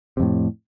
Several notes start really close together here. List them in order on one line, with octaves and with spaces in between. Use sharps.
C3 F2 A2